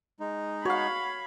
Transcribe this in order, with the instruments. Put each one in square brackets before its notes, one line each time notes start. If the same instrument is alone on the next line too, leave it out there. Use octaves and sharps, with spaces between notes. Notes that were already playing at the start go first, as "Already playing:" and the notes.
[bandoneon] G#3 D#4
[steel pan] F#4 [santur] C#5 F5 [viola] B5